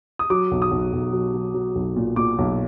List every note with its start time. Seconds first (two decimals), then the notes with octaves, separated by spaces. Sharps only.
0.19 D#6
0.30 F#3 D6
0.51 B1
0.62 D#6
0.71 B1
0.93 B1
1.13 F#3
1.34 F#3
1.54 F#3
1.75 B1
1.96 A#2
2.16 A#2 D6
2.38 B1